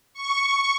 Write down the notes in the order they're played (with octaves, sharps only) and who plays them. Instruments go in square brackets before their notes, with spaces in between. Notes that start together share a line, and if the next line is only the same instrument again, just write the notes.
[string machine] C#6